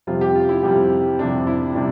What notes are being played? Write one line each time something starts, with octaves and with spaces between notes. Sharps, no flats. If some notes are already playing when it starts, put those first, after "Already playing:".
F2 C3 G3 F4
G4
F4
E4
F2 C3 G3 G4
F2 C3 G3 D4
E4
C3 G3 D4